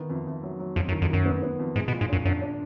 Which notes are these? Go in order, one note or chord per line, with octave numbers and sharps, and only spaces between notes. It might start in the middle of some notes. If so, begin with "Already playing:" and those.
Already playing: D#3 B3
F2
F2
F#3
F#3
F2 F#3
F#2
D#3
F2
F#2 D#3
B3
B3
F2
G#2 G#3
B2
A#2
G#2
F#2 D4
F#2 D4
D4